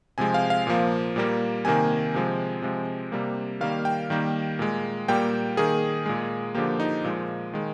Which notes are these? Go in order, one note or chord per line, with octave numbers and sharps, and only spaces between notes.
C3 F3 G#3 G#5
F5
F5
A#2 F3 A#3
A#2 G3 A#3
C3 D#3 A#3 G#5
C3 F3 G#3
C3 F3 G#3
C3 G3 A#3
D#3 G3 A#3 F5
G5
D#3 G3 A#3
A#2 G#3
A#2 G3 A#3 G5
D#3 A#3 G#4
A#2 G#3
D3 F3 A#3 G4
D#4
A#2 F3 G#3
D#3 G#3